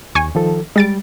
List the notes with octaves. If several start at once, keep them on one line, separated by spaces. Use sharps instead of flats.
D#2 G#5 C#6
D#3 F3 A4
G3 G#3 A6 D7